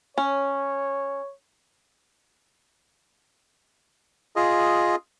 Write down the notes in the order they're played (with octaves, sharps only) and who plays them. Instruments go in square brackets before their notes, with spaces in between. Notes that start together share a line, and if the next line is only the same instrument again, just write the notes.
[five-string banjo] C#4 [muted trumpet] C#5
[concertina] F4 G#4 D#5